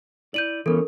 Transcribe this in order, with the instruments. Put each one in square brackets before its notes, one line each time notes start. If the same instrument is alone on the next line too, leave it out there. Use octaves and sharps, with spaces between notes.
[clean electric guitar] E4 D5 [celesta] G6 D#7 F#7
[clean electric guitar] E3 B3 C#4 [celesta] A4 A#4